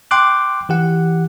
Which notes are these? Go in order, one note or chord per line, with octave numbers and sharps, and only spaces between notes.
G5 C6 D6 F#6
E3 G4 F#5